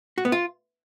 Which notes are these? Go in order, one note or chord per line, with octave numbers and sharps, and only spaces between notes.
F#4
B3
F4